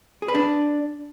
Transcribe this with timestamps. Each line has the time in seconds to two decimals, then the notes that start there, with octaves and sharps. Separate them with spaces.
0.22 G#4
0.28 B4
0.35 D4